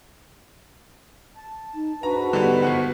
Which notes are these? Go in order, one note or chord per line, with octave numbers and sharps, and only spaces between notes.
A5
D#4
G#2 D4 F#4 B4 A#5
D3 G3 B3
G1 B3 F#5